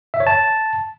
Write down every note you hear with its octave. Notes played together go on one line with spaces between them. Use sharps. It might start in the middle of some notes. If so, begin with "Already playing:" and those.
E5
C#5
A5